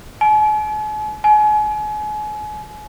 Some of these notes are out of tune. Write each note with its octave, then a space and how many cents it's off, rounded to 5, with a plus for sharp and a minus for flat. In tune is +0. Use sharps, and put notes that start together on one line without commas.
G#5 +45
G#5 +35